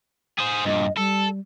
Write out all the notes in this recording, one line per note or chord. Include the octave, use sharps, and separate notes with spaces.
G#4 C5
G2 A#2 D#5
G3 A4